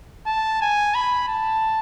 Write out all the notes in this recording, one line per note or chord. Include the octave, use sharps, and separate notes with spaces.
A5
G#5
B5
A5